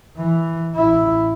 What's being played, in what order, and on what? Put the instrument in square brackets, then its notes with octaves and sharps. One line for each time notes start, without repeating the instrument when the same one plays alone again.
[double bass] E3
A1 E4